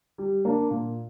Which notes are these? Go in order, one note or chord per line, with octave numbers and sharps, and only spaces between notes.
G3
A#3 D4
A#2